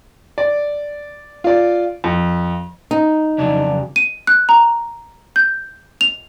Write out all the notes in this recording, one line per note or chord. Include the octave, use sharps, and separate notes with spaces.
D5
F4 D5
F2
D#4
F2 C#3 F#3 D4
D#7
F#6
A#5
G6
F7